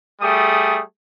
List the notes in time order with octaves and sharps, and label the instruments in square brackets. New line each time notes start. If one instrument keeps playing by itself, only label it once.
[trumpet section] G3 A3 G#4 D#6